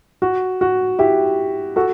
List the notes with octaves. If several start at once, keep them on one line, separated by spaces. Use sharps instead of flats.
F#4
F#4
E4 G4
F#4 A4